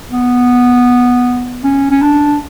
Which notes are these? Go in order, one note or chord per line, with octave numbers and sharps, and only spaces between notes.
B3
C#4
C#4
D4